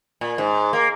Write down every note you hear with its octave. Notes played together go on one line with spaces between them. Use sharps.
A#2
G#2
A#3